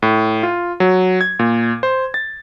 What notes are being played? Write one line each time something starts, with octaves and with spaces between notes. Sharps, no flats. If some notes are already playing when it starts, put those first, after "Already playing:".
A2
F4
F#3
G#6
A#2
C5
A6